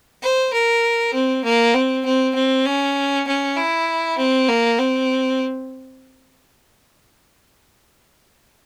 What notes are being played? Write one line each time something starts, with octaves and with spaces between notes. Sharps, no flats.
C5
A#4
C4
A#3
C4
C4
C4
C#4
C#4
E4
C4
A#3
C4